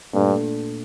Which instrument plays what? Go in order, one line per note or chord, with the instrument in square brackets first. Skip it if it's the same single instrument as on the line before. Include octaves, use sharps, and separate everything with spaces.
[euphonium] G2 [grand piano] A#2 A3 D4